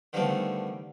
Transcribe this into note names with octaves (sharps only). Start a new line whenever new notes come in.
D3 D#3 F3 G3 A3 B3